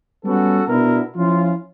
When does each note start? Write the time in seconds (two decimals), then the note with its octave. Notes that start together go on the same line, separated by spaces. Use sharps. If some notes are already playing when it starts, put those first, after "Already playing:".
0.25 G3 B3 C#4 F#4 A4
0.68 B2 B3 D4 E4 A#4
1.17 F3 C#4 E4 F4